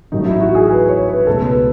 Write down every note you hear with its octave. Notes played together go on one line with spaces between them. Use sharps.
A1 A2 F#3 A3 D#4
E4
F#4
G#4
B4
C#5
B4
C#2 B2 A3 A4
B4